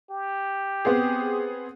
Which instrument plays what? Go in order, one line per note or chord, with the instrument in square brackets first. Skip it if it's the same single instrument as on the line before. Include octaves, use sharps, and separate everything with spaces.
[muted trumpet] G4
[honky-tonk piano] B3 C4 G#4